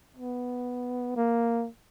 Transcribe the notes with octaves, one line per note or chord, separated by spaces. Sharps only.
B3
A#3